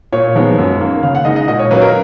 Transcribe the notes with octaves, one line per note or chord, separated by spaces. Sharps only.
A#2 C#5
F3 G#3 B3 D#4
F#2
D#3 A#3
C#3 F5
F#5
G#3 D#4 D#5
D#5
A#2 D#5
C#5
F#3 A#3 C#4 B4
A#4